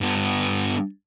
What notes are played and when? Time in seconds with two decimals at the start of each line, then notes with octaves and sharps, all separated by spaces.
0.01 G2 B3